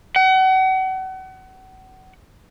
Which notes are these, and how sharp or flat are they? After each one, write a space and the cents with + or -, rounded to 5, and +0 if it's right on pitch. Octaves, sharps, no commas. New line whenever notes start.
F#5 +35